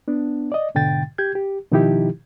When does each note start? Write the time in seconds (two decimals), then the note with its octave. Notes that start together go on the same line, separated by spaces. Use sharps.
0.08 B3 D4
0.52 D5 D#5
0.75 G#2 B2 D3 G5 A6
1.18 G4 G6 G#6
1.35 G4
1.71 B2 D#3 F3 D#4 E4 G4